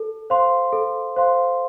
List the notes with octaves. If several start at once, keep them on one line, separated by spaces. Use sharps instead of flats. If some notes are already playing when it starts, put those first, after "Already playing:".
Already playing: A4
C5 F5 C6
A4
C5 F5 C6